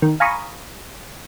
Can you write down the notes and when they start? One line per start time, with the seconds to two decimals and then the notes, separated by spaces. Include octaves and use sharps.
0.02 D#3
0.20 F5 G#5 A#5 B5 C#6 D#6